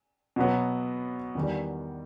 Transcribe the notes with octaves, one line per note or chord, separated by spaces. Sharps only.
B2 F#3 B3
E2 D#3 G3